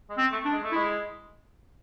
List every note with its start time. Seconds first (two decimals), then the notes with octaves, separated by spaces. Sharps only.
0.10 G#3
0.18 C4
0.32 A3
0.45 D4
0.52 G#3
0.63 A3
0.72 G#3 E4